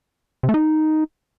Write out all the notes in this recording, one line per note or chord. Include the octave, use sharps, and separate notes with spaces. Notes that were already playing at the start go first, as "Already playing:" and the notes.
C3
A3
D#4